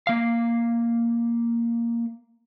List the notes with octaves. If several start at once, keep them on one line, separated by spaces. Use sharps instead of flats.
A#3 F5